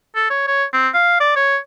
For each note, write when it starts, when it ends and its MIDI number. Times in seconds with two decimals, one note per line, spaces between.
0.16 0.25 69
0.30 0.44 73
0.47 0.65 73
0.74 0.88 60
0.94 1.19 77
1.20 1.35 74
1.36 1.58 73